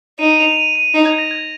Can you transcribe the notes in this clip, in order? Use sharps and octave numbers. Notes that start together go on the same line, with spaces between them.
D#4 D#7
F7
D#7
D#7
D#4
G#6
A#6
G#6